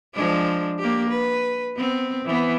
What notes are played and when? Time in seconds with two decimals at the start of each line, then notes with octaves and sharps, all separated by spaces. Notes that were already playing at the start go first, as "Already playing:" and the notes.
0.14 F3 G#3 D4
0.79 A#3 G4
1.09 B4
1.77 B3 C4
2.25 E3 B3